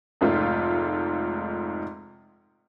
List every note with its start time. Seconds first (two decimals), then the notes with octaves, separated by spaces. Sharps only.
0.21 F1 G#2 A3 F4